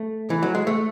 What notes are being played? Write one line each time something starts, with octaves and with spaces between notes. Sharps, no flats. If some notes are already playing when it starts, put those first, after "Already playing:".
Already playing: A3
E3
F#3
G#3
A3